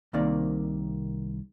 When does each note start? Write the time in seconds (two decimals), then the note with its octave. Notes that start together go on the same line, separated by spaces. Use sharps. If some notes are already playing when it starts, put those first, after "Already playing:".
0.13 C2 C3 D#3 A#3 D5